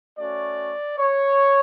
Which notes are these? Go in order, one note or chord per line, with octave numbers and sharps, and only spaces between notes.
A3 C#4 F#4 D5
C#5